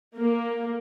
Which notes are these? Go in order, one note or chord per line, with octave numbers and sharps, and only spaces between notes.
A#3